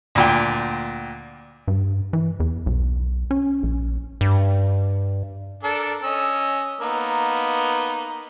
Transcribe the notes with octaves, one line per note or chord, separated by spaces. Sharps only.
D2 A#2 G5
G2
E3
E2
B1
C#4
A#1
G2
D4 A4 A#4
C#4 D#5 E6
A#3 B3 D#4